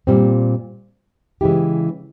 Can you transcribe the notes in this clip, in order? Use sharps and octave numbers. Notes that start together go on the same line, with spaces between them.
A#2 G3 C4
C#3 E3 G#3 E4 G4